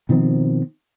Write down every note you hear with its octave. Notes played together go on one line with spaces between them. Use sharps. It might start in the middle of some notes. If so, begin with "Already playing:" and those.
B2 D#3 F3 C4